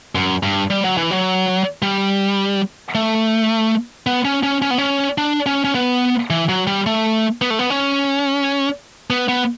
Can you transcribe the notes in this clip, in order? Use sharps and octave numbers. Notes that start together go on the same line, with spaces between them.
F#2
G2
G3
F#3
E3
F#3
G3
A3
B3
C#4
C#4
C#4
B3
C#4
D4
C#4
C#4
B3
E3
F#3
G3
A3
B3
A3
B3
C#4
B3
B3